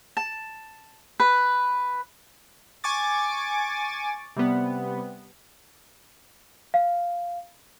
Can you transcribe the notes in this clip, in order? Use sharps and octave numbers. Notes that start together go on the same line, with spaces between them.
A5
B4
G#5 C#6 D6 A6
C3 G3 B3
F5